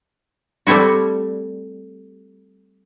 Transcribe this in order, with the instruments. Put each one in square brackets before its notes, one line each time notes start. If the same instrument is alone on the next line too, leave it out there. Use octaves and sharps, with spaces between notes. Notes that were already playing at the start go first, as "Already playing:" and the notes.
[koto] G3 A3 C4 E4 F#4